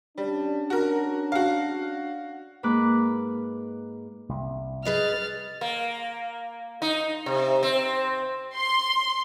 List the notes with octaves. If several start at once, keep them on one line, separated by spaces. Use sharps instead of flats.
G3 C#4 D4
F#4 A#4
F#4 F5
G#2 A#3 B4 D6 F#6
C2
G#4 B4 D#5 F6 A6
A#3
D#4
C3
C4
C6